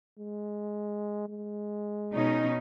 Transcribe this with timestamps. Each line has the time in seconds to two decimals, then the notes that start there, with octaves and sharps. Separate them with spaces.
0.19 G#3
1.28 G#3
2.14 B2 C#4 D#4